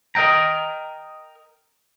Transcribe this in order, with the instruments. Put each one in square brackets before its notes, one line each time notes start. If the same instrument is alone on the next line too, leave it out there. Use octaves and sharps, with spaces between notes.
[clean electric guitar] A#4 D#5 F5 G5 A#5